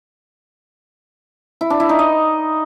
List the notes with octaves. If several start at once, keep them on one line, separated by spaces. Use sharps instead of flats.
E4
D4
E4
D#4
D#5